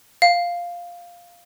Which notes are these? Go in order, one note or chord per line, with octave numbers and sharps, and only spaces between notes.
F5